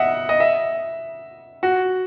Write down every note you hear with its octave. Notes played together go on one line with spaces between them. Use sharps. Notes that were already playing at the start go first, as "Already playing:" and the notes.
Already playing: D#5 E5 F#5
D#5
E5
F#4